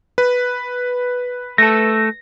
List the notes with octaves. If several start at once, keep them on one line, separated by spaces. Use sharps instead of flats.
B4
A3 A4 A#6